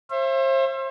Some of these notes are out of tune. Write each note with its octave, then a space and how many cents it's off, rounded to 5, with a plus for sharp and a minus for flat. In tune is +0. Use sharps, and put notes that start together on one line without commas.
C5 +35 E5 +35